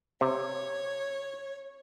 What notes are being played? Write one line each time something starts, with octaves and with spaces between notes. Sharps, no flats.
C3 C#5